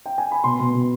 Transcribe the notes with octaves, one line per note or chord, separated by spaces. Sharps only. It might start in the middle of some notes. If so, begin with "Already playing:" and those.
G5
G#5
B5
B2 C6
B2
B2